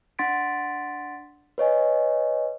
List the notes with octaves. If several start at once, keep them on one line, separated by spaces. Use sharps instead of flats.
D4 F#5 C6 A6 B6 D7
B4 C#5 D#5 G#5